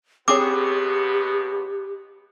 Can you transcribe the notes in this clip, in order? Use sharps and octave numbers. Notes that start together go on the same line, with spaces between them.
C#2 B2 B3 C4 G4 G#4 C#5 D6